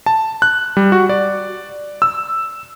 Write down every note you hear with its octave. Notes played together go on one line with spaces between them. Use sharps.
A5
F#6
G3
F#4
D5
E6